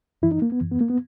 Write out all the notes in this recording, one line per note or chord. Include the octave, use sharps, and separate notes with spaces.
F#2 E3 E4
D#4
A#3
B3
F#2 E3
B3
A#3
B3